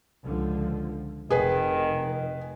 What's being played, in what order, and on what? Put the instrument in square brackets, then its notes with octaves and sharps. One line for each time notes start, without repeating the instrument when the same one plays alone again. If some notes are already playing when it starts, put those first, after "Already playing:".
[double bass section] C#2 D3 F3
[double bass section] F1 [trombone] D#3 [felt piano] G#4 B4